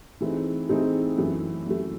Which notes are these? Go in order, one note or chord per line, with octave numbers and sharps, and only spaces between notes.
E3 A3 C4 D#4 G#4
E3 A3 C4 D#4 G#4
F#2 E3 A3
F#2 E3 A3